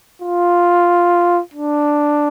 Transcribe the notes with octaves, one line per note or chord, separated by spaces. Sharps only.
F4
D4